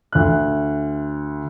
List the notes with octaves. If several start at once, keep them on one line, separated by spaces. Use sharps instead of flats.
D2 F#6